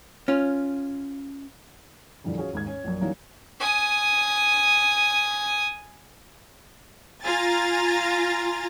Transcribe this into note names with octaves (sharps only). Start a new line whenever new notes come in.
C#4 F4
F2 A#2 D3 E3 G3
C#4 F4 F#4 G#4
D#2 G#2 G#6
C#4
A#1 F#2
E3 F#3 G3 A#3 C#4 D#4
G#5 D#6
F4 G#5 A#5 A6